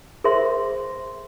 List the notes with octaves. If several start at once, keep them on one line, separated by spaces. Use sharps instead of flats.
G#4 A#4 C5 E5 C6